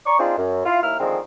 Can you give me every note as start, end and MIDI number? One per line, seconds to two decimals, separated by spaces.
0.06 0.16 74
0.06 0.16 82
0.06 0.16 85
0.19 0.36 60
0.19 0.36 62
0.19 0.36 63
0.19 0.36 65
0.19 0.36 68
0.38 0.64 42
0.65 0.80 64
0.65 0.80 65
0.82 0.97 39
0.82 0.97 58
0.82 0.97 64
0.82 0.97 89
1.00 1.19 50
1.00 1.19 51
1.00 1.19 53
1.00 1.19 56
1.00 1.19 60